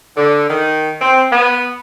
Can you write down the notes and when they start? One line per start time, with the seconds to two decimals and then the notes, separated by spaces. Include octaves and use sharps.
0.17 D3
0.49 D#3
1.02 C4
1.32 B3